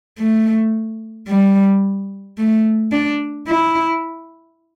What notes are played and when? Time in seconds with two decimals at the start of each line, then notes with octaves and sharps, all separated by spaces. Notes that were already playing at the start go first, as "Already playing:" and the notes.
0.19 A3
1.28 G3
2.38 A3
2.92 D4
3.48 E4